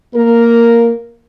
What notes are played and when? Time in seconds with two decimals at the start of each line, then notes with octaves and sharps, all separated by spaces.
0.15 A#3 A#4